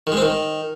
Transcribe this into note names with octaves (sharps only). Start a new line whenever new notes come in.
D#3
G#3
C4
D#3